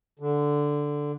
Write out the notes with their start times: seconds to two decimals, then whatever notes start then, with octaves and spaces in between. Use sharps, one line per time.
0.20 D3